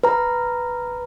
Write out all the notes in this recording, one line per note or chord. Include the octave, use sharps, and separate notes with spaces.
B4 A#5